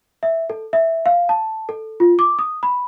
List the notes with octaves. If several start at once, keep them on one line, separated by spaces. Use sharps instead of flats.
E5
A4
E5
F5
A5
A4
F4
D6
D#6
B5